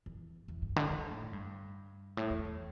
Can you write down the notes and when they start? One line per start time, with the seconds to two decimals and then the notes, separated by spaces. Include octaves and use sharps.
0.06 E2
0.48 E2
0.62 G2
0.76 D3
0.90 D3
1.11 A2
1.33 G2
2.17 A2
2.30 E2
2.45 E2